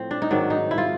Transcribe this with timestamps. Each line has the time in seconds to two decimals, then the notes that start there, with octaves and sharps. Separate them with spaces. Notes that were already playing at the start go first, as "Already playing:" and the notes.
Already playing: A2 F3 C4
0.11 D4
0.22 D#4
0.30 G#2 D#3 F#3 D4
0.50 D#4
0.71 E4
0.78 F4